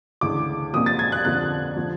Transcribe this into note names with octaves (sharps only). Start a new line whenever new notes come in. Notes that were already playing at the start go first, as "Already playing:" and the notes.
D2 C#3 E3 D6
C2 A#2 F3 D#6
A6
G#6
F#6
F2 D3 F3 F#6
D3 F3